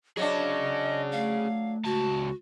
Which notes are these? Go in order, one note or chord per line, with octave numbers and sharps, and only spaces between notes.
F#3 D4 G#4 C#5 D#5
A3 F5
C#2 F#4 A5